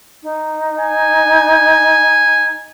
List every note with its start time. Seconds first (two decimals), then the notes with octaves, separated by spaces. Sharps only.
0.23 D#4
0.80 G#5